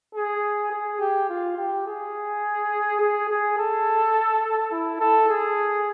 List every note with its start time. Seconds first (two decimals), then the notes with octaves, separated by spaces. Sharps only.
0.15 G#4
0.72 G#4
1.00 G4
1.29 F4
1.57 G4
1.87 G#4
3.00 G#4
3.30 G#4
3.58 A4
4.72 E4
5.00 A4
5.29 G#4